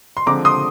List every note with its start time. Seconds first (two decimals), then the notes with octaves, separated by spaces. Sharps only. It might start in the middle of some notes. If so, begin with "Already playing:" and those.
0.17 C6
0.26 D3 F3 G#3 C4 A#5 D6
0.45 C6 D#6